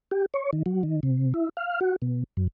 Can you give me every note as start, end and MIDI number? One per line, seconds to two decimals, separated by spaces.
0.11 0.26 67
0.34 0.51 73
0.53 0.63 51
0.66 0.83 54
0.83 1.00 51
1.03 1.33 48
1.34 1.49 64
1.57 1.80 77
1.81 1.96 66
2.02 2.24 47
2.37 2.47 42